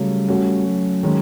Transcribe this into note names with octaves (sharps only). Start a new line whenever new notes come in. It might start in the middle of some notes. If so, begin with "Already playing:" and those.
Already playing: C#3 F#3 G3 A3 C#4
A3 C#4 F#4
F#3
D#3 G#3 C#4